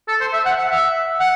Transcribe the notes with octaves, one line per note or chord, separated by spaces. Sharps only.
A4
C5
E5
F#5
F#5
E5
F#5